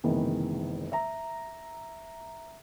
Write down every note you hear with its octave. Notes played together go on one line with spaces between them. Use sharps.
F#1 C3 D#3 E3 G#3 B3
E5 A#5